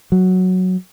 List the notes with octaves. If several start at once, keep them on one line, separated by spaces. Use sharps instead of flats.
F#3